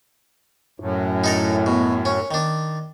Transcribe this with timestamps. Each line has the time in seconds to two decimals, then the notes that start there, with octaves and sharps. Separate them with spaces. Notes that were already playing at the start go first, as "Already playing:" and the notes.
0.80 F#2 A2
1.24 D#4 A4 A#4
1.66 B2
2.05 C#4
2.31 D#3 D4